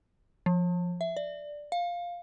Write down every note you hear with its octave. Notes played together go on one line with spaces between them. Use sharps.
F3
E5
D5
F5